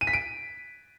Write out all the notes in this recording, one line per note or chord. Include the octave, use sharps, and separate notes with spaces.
D#7
B6
D7